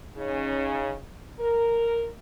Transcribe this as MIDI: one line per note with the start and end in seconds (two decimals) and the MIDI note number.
0.17 0.95 49
0.17 0.95 61
0.17 0.95 63
1.39 2.09 70